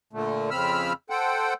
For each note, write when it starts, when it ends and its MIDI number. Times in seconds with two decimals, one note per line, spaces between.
0.13 0.50 46
0.13 0.50 50
0.13 0.50 57
0.51 0.93 41
0.51 0.93 49
0.51 0.93 60
0.51 0.93 83
0.51 0.93 88
0.51 0.93 89
1.10 1.54 69
1.10 1.54 72
1.10 1.54 78
1.10 1.54 79